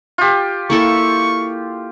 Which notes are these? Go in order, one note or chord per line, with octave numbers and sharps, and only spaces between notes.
F4 G4
A#3 E4 A4 C#6